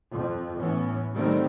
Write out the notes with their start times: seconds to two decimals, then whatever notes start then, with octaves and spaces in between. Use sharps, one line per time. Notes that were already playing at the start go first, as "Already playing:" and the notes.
0.11 F2
0.56 A2 E3 B3 C#4
1.15 D3 D#3 G3 A3 C4